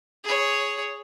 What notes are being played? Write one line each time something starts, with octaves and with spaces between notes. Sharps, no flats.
G#4 C#5